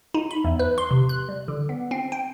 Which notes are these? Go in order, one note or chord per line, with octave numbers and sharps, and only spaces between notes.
D#4
B5
E2
B4
C6
C3
F#6
G3
D3
B3
C4
G5